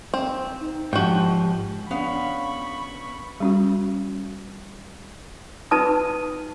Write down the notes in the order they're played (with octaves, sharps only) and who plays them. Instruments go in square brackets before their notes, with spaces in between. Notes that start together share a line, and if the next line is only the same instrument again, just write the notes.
[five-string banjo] C4
[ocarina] D#4
[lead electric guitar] G#2 F3 [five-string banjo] F#4 G5 [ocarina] G4
[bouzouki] B3 F5 [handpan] C#4 D4 [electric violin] B5 C#6
[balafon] G3 C#4 F#4
[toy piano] D#4 B4 A5 D#6